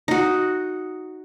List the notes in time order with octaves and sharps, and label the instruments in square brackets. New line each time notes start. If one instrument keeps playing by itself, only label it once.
[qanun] D#4 F#4